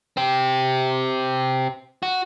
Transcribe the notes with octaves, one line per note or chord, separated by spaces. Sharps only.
C4 G4
F#4